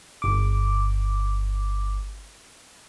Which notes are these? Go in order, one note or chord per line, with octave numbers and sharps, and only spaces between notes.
G1 D6